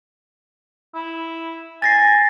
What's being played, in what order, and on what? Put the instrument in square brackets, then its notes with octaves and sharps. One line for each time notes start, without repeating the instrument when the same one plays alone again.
[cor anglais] E4
[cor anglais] G#5 [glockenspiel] A6 A#6 C7